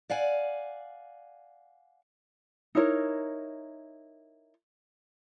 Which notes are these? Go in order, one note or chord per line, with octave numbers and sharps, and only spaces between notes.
D5 F5 F#5 G#5
D#4 E4 A#4 C#5